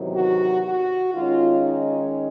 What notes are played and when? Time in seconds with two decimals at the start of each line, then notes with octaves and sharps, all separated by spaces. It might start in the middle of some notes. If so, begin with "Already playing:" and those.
Already playing: E2 C3 D#3 F#3
0.15 F#4
0.65 F#4
1.14 D#3 G#3 C#4 F4
1.63 D#4